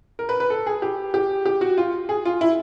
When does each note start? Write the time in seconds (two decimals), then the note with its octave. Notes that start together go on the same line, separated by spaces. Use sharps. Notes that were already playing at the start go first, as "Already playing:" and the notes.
0.19 A#4
0.29 B4
0.40 B4
0.50 A4
0.66 G#4
0.82 G4
1.14 G4
1.46 G4
1.61 F#4
1.78 F4
2.09 G#4
2.25 F4
2.41 E4